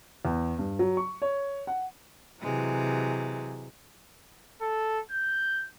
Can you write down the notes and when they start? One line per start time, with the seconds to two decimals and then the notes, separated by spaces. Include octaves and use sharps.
0.25 E2
0.59 G2
0.79 F#3
0.97 C#6
1.22 C#5
1.67 F#5
2.41 C3 E3 F#3 G#3
4.61 A4
5.11 G6